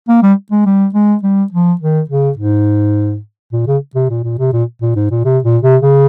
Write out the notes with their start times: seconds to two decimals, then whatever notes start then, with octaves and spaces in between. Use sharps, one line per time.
0.09 A#3
0.23 G3
0.51 G#3
0.66 G3
0.94 G#3
1.23 G3
1.52 F3
1.81 D#3
2.09 C#3
2.38 G#2
3.53 A#2
3.67 C#3
3.95 C3
4.10 A#2
4.24 A#2
4.39 C3
4.53 A#2
4.82 A#2
4.96 G#2
5.11 A#2
5.25 C3
5.44 A#2
5.63 C3
5.82 C#3